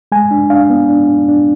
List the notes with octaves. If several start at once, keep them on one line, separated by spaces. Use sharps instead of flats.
G#3 G#5
D4
D4 F5
B3
D4
D4
D4